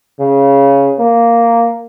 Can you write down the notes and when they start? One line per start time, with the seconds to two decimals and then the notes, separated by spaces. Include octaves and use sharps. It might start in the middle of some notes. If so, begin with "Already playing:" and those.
0.20 C#3
0.99 A#3